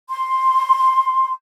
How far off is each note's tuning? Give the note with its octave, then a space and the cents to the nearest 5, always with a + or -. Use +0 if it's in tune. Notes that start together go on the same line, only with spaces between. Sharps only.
C6 +5